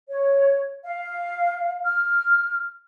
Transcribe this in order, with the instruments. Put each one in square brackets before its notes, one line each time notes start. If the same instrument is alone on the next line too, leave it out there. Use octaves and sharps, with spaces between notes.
[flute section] C#5
F5
F6